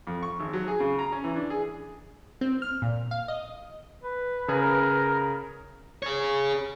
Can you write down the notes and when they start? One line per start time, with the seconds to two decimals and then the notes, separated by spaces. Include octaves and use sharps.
0.07 F2
0.23 C#6
0.40 G#1
0.53 F#3
0.68 G#4
0.80 C#3
0.99 A#5
1.12 C#4
1.24 E3
1.36 D4
1.50 G#4
2.41 C4
2.62 F6
2.82 A#2
3.11 F5
3.28 D#5
4.03 B4
4.48 C#3 G#4 A#4
6.03 G#4 C#5